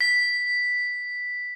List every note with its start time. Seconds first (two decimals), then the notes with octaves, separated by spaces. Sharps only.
0.01 B6